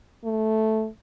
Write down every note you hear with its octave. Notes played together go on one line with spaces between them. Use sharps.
A3